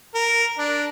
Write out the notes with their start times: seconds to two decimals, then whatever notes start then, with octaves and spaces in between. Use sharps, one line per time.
0.14 A#4
0.58 D4